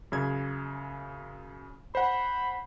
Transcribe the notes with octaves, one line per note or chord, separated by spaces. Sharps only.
F#2 C#3 G#6
C5 F#5 B5